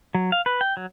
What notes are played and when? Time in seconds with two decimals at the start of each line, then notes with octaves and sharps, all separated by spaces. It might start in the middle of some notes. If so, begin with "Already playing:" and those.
0.15 F#3
0.32 F5
0.46 B4
0.61 G5
0.77 F#3